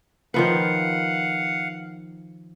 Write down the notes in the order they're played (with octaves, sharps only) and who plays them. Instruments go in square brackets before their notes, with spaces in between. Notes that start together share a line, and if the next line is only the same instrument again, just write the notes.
[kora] D#3 F3 B4 [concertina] F5 F#5